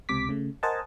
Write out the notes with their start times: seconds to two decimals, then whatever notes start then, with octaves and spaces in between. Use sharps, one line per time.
0.09 C#2 C3 D6 B6
0.29 C#3 A3
0.63 A#4 C5 D#5 F#5 G#5 A5